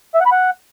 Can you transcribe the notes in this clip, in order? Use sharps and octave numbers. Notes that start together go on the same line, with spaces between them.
E5
F#5
B5
F#5